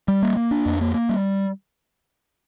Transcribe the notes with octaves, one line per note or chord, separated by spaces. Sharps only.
G3
A#3
A#3
D4
F2
A#3
A#3
G3